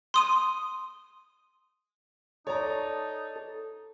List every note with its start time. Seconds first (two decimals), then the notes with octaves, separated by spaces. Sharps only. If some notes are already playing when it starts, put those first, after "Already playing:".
0.14 C6 D#6 D#7
2.47 D#4 A4 C#5 D5 A#5